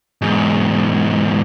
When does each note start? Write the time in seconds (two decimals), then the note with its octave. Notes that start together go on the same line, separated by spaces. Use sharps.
0.22 E2 G#2